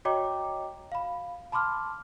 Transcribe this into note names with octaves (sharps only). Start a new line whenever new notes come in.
F#4 C#5 D#5 G5 A#5 D6
F5 B5
A5 B5 C6 D6 F6